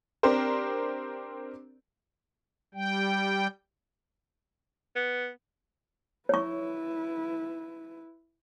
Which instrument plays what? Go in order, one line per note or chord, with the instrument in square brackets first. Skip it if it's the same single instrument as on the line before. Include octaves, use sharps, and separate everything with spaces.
[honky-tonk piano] C4 D4 G4 A#4 C5
[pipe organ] G3 G5
[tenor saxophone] B3
[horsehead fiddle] E4 B4 [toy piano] C#5 C#6